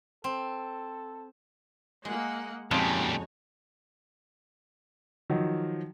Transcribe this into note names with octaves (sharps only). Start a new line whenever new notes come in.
C4 A4
G#3 A#3 D#5 F#5
F2 A#2 C#3 G3 G#3 D#4 F#4 C#5
D#3 F3 F#3